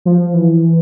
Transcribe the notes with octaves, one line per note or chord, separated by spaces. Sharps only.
F3
E3